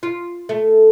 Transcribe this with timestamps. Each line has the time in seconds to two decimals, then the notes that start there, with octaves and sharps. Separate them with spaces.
0.03 F4
0.49 A3